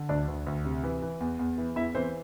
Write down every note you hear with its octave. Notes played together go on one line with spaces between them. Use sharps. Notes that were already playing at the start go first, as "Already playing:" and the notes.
Already playing: D3
D2 D4 D5
D2
D2
C3
E3
E3
E2
E2
E3
E2 E4 E5
E3 C4 C5